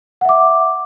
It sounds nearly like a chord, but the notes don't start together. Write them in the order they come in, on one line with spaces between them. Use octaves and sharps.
F#5 E5 D6